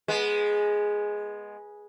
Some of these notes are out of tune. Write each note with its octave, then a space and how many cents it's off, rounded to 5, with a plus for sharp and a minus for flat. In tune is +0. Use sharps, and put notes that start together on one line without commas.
G#3 +0 B3 -20